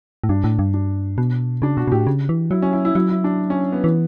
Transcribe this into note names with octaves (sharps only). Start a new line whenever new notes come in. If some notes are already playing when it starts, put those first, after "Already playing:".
A2
G2 D4
A2
G2
D4
B2
C#3 D4
B2 F#4
B2
A2 G4
C#3
E3
F#3 E4
C#4
E4
E4
F#3 E4
E4
D4
C#4
B3
E3